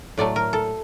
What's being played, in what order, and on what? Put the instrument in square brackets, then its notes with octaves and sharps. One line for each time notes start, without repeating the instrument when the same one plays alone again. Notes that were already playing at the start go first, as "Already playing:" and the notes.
[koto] A2 F#3 A3 D5
A#4
A4